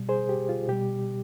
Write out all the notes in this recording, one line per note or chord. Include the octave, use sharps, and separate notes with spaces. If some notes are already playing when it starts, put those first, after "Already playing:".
Already playing: B2 G3
G#4 C5
G4
F4
B2 G3 G4